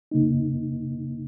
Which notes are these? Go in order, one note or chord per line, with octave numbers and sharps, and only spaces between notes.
C#3 A#3 D#4